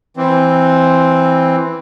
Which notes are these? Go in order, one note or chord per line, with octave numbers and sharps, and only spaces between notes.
E3 C4